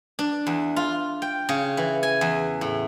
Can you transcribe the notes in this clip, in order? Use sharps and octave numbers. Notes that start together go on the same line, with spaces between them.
D4
E2
F4
G5
C#3
E3
G#5
E2
A2